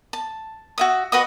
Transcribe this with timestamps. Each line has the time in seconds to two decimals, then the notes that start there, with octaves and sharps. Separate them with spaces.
0.13 A5
0.78 F#4 E5 D#6
1.12 F#4 B4 D#5 D#6